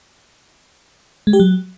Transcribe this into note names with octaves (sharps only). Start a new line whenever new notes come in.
G#3
G4
F#3